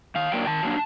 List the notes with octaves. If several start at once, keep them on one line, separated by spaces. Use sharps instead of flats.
D#3 F5
F#3 A#3 D4 G5
D#3 A5
F#3 A#3 D4